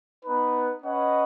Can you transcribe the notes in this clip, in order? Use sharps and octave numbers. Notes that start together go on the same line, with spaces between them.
B3 D#4 B4
C#4 B4 D#5 F#5